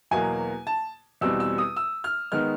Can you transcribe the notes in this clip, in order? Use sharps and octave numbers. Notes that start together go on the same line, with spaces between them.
E2 B2 F#3 A#3 G#5
A5
E2 B2 G3 C4 E6
E6
D#6
E6
F6
D#3 G#3 B3 F6